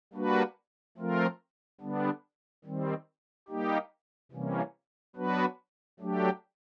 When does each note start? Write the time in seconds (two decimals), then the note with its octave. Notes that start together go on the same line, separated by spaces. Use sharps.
0.13 G3 A#3 D4 F#4 B4
0.98 F3 A3 C4 F4 A#4
1.81 D3 G3 B3 D4
2.65 D#3 G3 C4
3.48 G3 A#3 D#4 G4
4.32 C3 E3 G3 A#3 C#4
5.16 F#3 B3 D4 F#4 B4
6.00 F#3 A3 D4 G4